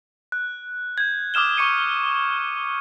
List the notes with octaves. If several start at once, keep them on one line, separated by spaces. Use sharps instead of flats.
F#6
G6 G#6
D6 D#6 F6 E7 G7
C#6 D6 C#7 D#7